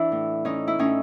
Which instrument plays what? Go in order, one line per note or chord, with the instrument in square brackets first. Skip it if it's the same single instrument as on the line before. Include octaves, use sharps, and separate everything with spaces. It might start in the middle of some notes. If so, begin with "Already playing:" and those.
Already playing: [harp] E3 D4 E4
A2
E3 C#4 D#4
E4
A2 C#4 D#4